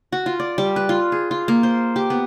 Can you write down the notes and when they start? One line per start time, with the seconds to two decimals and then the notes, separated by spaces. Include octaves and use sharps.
0.12 F#4
0.26 F4
0.40 D5
0.58 G3
0.76 B4
0.89 F4
1.12 G#4
1.31 F4
1.48 A#3
1.63 C5
1.96 G4
2.10 B3